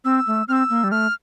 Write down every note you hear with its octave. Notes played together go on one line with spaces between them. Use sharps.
C4 E6
A3
C4 E6 F6
A#3
G3
A3 F6